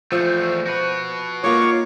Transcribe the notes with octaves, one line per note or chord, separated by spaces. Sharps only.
E2 F3 A3 C5 E5
F#4 B4
A#3 D#4 F4 C#5 C#6 D6